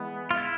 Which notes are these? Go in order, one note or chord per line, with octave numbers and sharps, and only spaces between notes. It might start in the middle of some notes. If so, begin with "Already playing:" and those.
Already playing: E3 G#3 B3
F4
E4